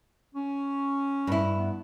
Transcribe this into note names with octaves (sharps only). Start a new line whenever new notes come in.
C#4
G2 E4
B3